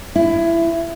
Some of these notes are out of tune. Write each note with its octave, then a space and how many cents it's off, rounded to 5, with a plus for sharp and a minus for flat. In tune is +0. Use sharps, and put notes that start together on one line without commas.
E4 +20